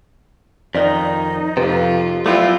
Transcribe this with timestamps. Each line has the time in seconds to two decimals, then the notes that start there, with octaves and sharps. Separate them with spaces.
0.75 F2 D#3 D#4 D5
1.57 F2 C3 F4 B4
2.26 F#3 A3 B3 C4 E4 F4